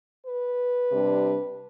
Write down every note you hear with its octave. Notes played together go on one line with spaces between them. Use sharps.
B4
C3 G3 D4